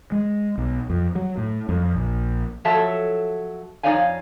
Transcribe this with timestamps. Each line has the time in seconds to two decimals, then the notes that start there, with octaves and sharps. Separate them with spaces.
0.12 G#3
0.58 B1
0.90 F2
1.15 F#3
1.37 A2
1.69 F2
1.95 A#1
2.65 F3 F#3 A4 C#5 E5 A5
3.83 F2 D#4 C#5 D5 F5 G#5